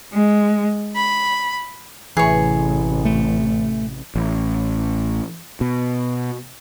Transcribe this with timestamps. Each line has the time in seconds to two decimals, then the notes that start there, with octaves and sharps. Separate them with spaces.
0.14 G#3
0.95 B5
2.17 A1 C3 E3 G#4 C#5
3.05 A3
4.15 A1
5.61 B2